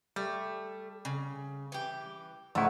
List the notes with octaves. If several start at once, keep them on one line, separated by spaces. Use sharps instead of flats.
G3 A3
C#3
E3 G4
G#2 C#3 A3 D#4 E4 F#5